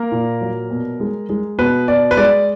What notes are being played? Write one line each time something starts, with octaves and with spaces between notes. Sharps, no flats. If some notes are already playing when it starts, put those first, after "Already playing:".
Already playing: A#3 A#4
A#2
F#3
B2
G#3
G#3
B2 B4
B2 D5
B4
G#3 D5